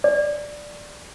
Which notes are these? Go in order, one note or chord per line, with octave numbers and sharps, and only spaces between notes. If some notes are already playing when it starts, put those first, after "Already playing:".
D5